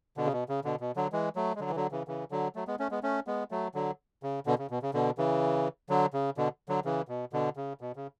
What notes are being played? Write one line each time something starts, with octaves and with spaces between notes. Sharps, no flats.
B2 D3
C#3
B2
C#3
B2 D3
B2
D3 F#3
E3 G#3
F#3 A3
G#3
D3 F#3
E3
D3 F#3
C#3 E3
C#3 E3
D3 F#3
F#3 A3
G#3 B3
A3 C#4
G#3 B3
A3 C#4
G#3 B3
F#3 A3
D3 F#3
C#3
B2 D3
C#3
B2
C#3
B2 D3
C#3 E3
D3 F#3
C#3
B2 D3
D3 F#3
C#3 E3
B2
B2 D3
C#3
B2
C#3